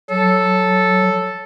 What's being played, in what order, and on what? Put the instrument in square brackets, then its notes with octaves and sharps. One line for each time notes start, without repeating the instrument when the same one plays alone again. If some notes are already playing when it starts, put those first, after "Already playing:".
[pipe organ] F#3 [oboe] A4